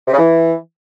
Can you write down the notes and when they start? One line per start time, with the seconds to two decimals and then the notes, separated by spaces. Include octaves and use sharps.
0.07 C3
0.12 C#3
0.18 E3